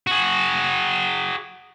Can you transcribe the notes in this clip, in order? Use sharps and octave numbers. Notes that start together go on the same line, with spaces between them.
F#4 G#4